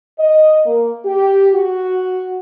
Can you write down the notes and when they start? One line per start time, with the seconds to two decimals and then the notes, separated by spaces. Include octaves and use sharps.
0.19 D#5
0.66 A#3
1.06 G4
1.54 F#4